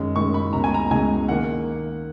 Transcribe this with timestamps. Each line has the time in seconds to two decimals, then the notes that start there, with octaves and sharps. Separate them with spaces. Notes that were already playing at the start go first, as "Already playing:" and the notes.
Already playing: F#2 D#3 G#3
0.16 F#2 D#3 G#3 C#6
0.34 B5
0.53 C#2 B2 G#3 A#5
0.64 G#5
0.74 A#5
0.90 C#2 B2 G#3 G#5
1.29 D#3 A#3 F#5